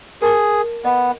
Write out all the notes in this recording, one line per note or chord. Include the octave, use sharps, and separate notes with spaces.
G#4 A#4 A5 D6
B3 D#5